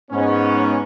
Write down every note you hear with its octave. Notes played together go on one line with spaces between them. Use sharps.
G#2 B3 C#4